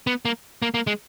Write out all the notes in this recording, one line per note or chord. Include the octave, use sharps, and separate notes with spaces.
B3
A#3
A#3
A#3
G#3